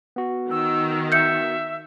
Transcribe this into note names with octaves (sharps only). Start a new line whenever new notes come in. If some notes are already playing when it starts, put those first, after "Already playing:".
B3 F#4
D#3 E6
E5 G6 C#7